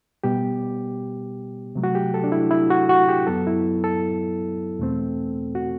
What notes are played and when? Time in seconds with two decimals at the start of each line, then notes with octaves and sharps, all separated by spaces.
0.24 B2 G3 B3 G4
1.75 C3 F#3 A3
1.84 F#4
1.95 G4
2.14 A4
2.24 D4
2.32 E4
2.51 E4
2.70 F#4
2.89 F#4
3.08 G4
3.27 F#2 F#3 B3 A4
3.47 E4
3.84 A4
4.79 E2 B2 A3 C4
5.55 F#4